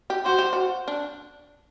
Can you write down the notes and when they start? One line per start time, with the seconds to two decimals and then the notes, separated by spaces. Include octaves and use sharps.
0.10 G4
0.26 F#4 C5
0.39 G4
0.53 F#4
0.88 D4